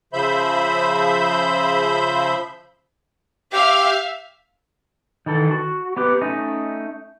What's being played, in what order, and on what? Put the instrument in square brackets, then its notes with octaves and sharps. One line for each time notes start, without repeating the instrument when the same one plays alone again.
[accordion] C#3 F3 C5 E5 B5 G6
[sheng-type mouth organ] G4 G5 [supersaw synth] E5 [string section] F5
[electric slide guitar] D#3 E3 A4
F#4
B3 G4 B4
A3 C#4 D#4 D#5